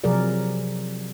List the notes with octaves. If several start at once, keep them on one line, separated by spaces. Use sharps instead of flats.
C3 F3 F#3 G#4 A#4 D5